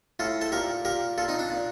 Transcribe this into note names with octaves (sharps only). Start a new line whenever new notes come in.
A2 F4 A4
A4 C5
A#2 G4 A#4
A#2 G4 A#4
A#2 F4 A4
C4 D#4
D4
A#2